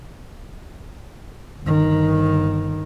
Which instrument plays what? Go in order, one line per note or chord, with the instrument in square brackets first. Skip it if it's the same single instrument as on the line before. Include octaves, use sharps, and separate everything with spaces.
[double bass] G1 D#3